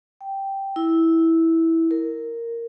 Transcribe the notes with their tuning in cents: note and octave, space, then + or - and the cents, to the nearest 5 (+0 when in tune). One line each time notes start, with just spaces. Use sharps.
G5 -5
E4 -10
A#4 -5